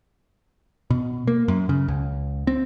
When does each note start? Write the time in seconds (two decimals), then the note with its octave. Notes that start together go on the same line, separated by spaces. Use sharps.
0.90 B2
1.27 A#3
1.48 F#2
1.69 C#3
1.88 C#2
2.47 C4